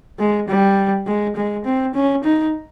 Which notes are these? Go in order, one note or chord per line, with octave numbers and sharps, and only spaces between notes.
G#3
G3
G#3
G#3
C4
C#4
D#4